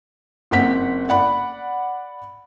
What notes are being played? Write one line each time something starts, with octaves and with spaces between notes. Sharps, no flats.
F#1 C4 F#5 B6
D5 F#5 B5